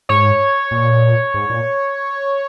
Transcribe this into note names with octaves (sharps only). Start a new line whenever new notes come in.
G#2 C#5
A#2
G#2
A#2